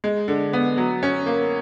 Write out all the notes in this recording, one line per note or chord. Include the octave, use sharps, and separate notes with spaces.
G#3
D3
B3
F#3
C#4
A#3